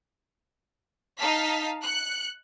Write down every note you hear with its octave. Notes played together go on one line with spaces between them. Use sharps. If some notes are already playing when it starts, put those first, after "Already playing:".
D#4 F5 A5 B6
F#6 C#7